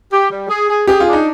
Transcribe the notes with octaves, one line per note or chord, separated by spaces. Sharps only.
G4
G3
G#4
G#4
G4 G#4
F4
D4
D#4